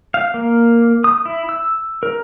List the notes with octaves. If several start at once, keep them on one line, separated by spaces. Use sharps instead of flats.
F5
A#3
D#6
E4
E6
A#4